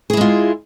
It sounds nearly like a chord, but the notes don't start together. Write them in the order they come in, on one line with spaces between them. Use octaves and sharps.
G#4 E4 G#3 F4